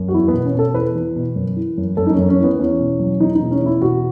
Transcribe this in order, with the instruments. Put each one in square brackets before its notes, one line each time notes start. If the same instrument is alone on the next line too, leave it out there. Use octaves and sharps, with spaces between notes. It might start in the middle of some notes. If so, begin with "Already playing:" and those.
Already playing: [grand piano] F#2
F#4
E2 E4
B3
B2
C#4
B2 A4
E2 B4
E2
B2
F#2
E3
F#2
F#2 A4
D#4
C#4
F#2
C#4
E3
B3
E2 C#4
B2
F#3
E2 D#4
B2 D#4
C#4
E2 E4
B2 F#4